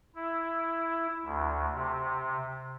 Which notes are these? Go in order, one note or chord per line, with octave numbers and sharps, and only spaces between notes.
E4
D2
C3